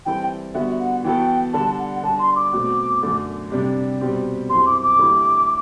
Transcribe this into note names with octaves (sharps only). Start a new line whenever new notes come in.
E3 G3 C4 E4 A4 G5
D3 G3 B3 F#4 E5
F#5
E3 B3 F#4 A4 G5
D3 G3 D4 A5
F#5
D3 G3 D4 A5
C6
D6
B2 F#3 A3 C4 F#4
F#2 D3 A3
C3 G3 D4 G4
B2 G3 C4 G4
F#2 F#3 C4 E4 G4 C6
D6
D6
D3 A3 E4 G4